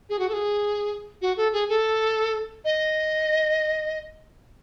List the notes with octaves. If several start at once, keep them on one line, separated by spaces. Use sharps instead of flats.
G#4
F#4
A4
G#4
F#4
A4
G#4
A4
D#5